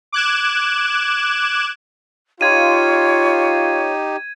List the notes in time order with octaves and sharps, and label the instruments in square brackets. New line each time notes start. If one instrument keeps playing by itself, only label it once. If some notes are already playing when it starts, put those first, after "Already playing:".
[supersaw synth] D6 F#6 G#6 E7
[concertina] D#4 G4 [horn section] F4 [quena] C#5 [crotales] G#6 D#7